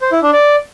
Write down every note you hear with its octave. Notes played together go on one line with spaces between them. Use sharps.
C5
E4
D4
D5